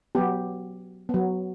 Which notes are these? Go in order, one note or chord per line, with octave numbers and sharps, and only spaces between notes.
F#3 B3 G4
F#3 B3